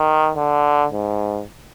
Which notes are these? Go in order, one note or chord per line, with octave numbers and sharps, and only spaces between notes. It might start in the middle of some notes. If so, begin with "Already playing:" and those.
Already playing: D#3
D3
G#2